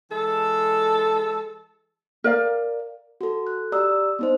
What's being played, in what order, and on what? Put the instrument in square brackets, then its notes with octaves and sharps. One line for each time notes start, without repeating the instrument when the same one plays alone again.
[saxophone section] E3 G#3 A4
[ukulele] A#4 D5 F5
[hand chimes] F#4 A4
F#6
G4 D5 A#5 D#6 E6
B3 D#4 C5